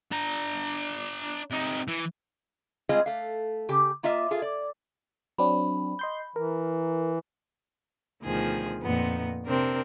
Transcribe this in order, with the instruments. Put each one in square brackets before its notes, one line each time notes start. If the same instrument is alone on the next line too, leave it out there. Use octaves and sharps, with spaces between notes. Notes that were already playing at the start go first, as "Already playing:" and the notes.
[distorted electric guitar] D4 A#5
C3 D#4
E3
[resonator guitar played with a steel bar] G3 G#3 C4 F4 G#4 D#5
A3 F5
C#3 G4
A#3 F4 D#5 E5
F4 G#4 A4 F5
D5
[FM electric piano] F#3 C4 D4 [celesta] B5
[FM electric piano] D#5 C6 G6
[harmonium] E3 [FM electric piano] A#4
[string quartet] D2 B2 D#3 F3 G#4
F2 A#2 B3 D#4
C3 C4 D4 A#4